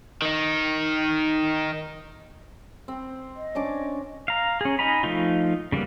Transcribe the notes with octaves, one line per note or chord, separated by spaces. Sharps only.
D#3 D#4
C4
D#5
C#4 D4 D6
F5 A#5
C#4 G#4
D#4 D#5 G#5 A#5 B5
F3 A3 D#4 F4
C#3 G3 A#3 B3